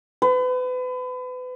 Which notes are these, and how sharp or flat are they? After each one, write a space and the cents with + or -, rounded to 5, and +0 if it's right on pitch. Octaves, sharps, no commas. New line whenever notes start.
B4 +35